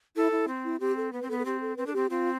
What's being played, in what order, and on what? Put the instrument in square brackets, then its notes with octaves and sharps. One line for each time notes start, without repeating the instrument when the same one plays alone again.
[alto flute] E4 [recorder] A4
[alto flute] E4
[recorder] C4
[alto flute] E4
[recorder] C4 [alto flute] G4
[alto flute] A4
[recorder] B3 [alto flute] B4
[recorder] C4
[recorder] B3 [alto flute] A4
[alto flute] A4
[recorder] C4 [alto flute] G4
[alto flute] A4
[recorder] C4 [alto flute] B4
[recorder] D4 [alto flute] A4
[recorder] C4 [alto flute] G4
[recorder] C4 [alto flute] F4